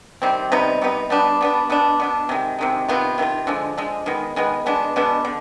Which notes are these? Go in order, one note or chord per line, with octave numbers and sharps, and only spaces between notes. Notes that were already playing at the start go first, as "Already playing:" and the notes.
C3 D#3 G3 C4
C3 G3 B3 D#4
C3 G3 B3 D#4
G3 B3 D4
G3 B3 D4
B2 B3 D4
B2 B3 D4
C3 D#3 G#3
C3 D#3 G#3
C3 D#3 B3 F4
C3 D#3 B3 F4
D3 F3 G#3
D3 F3 G#3
D#3 G#3 B3
D#3 G#3 B3
B2 G#3 B3 D4
B2 G#3 B3 D4
D3